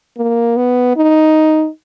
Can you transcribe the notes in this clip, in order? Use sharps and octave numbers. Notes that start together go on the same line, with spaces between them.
A#3
B3
D#4